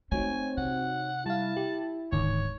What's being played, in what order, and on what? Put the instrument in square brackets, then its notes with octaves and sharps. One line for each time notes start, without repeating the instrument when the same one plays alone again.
[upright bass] A3 [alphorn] C4 [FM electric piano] D#4 F#4 C#5 [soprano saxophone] G#5
[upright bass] C3 [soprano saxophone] F#5
[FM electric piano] G3 F5 [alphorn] E4 [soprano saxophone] A5
[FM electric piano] G4
[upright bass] D1 [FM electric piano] G#2 D3 D#3 [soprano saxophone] C#5